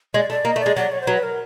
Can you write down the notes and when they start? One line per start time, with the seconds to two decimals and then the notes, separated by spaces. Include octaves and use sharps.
0.14 G#3 D5
0.30 A3 D5
0.45 A#3 D#5
0.56 A3
0.60 D5
0.66 G#3
0.76 F#3 D5
0.92 C#5
1.02 C5
1.07 F#3 B4
1.23 A#4